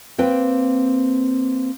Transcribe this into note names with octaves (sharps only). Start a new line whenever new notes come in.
A#3 C4 B4 G5